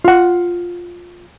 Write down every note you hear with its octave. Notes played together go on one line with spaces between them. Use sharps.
F4 F#5